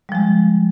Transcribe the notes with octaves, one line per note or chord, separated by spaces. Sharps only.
F3 G3 G#3